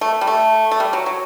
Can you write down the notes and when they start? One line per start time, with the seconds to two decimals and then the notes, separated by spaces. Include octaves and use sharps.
0.01 A3
0.21 G3
0.27 A3
0.71 A3
0.80 G3
0.93 F#3
1.06 F#3